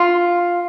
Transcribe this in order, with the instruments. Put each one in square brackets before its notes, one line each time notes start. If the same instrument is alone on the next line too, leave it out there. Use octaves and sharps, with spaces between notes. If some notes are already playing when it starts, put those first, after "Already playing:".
Already playing: [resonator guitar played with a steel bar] F4